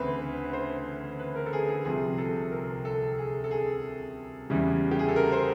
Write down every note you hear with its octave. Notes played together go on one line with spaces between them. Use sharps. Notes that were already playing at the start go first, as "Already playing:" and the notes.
Already playing: D2 C#3 E3 A3 C4 B4 C5
C5
B4
A#4
A4
G#4
G#4
C2 C3 F3 G#4
A4
A#4
A4
G#4
A4
G#4
E2 C#3 E3 G3
G4
G#4
A4
A#4
C5